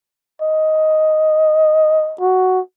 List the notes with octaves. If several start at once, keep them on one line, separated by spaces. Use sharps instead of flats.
D#5
F#4